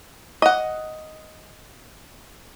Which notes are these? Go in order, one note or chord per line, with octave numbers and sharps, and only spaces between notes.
D#5 F#5